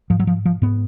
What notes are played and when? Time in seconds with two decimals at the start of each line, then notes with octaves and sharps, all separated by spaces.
0.10 G#2 F3
0.19 F#3
0.27 F3
0.45 F3
0.62 G#2 B3